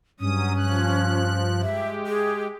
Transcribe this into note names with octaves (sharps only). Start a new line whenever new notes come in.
G2 F#3 C#4 D#6
F3 F#6
G#3 G4 E5
G#4